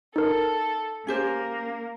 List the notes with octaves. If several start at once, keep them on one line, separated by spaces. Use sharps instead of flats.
D#4 A4 A#4
A#3 C#4 G4 C5